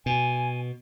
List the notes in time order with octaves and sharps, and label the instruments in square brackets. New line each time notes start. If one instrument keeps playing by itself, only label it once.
[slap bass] B2 [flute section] G#5